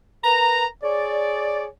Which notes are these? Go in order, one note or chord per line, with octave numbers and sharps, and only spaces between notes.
A#4 B4 A#5
G#4 C#5 D5